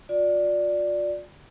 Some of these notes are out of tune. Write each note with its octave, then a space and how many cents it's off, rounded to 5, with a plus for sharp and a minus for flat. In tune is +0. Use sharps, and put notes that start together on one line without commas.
F4 +40 D5 +0